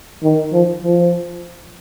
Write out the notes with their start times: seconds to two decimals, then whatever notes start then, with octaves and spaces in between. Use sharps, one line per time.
0.23 D#3
0.52 F3
0.83 F3